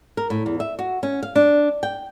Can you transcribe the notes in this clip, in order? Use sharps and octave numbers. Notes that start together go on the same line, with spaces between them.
A#4
A2
E2
E5
F#4
C#4
F5
D4
G5